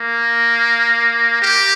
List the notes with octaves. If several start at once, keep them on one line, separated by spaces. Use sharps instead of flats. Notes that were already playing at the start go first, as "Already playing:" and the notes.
Already playing: A#3
G4